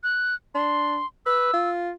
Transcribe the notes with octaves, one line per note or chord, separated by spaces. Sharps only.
F#6
D4 C6
B4 E6
F4